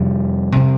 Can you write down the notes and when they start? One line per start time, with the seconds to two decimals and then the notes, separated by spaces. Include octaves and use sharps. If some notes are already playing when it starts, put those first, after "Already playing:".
Already playing: F2 C3 G3
0.56 C3